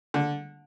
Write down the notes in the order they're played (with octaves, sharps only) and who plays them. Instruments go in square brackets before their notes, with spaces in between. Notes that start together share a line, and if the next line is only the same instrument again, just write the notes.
[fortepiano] D3